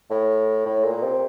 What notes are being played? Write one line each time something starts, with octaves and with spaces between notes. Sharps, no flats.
A2
A2
A#2
C3